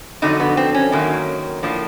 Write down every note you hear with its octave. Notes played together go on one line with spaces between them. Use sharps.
F2 D3 F#3 D#4
B3
C4
C#4
F#2 D#3 F#3 A#3
A2 F3 A#3 D4